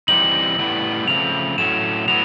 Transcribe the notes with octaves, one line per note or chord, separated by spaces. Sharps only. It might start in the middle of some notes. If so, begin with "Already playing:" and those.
E3 G3 C4 D#4 F#7
A2 E3 G3 B3
C#3 F3 A3 C4 F7
A2 F#3 A3 C#4 E7
A2 F#3 B3 F7